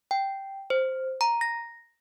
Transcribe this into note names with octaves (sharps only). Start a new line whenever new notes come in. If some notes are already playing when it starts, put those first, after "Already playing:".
G5
C5
A#5
A#6